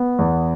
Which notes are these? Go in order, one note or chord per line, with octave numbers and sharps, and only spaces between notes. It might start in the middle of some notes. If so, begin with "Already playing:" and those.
Already playing: B3
E2